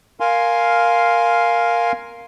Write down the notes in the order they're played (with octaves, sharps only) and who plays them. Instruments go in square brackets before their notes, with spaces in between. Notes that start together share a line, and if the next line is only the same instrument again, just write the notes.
[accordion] A#4 F5 G#5 C6